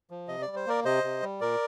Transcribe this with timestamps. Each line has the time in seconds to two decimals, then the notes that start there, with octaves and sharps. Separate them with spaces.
0.10 F3
0.28 C3 D#5
0.42 D5
0.47 G3
0.56 C5
0.67 A#3 A#4 D5
0.85 C3 C5 D#5
1.04 C3
1.22 G3
1.40 A#2 A#4 D5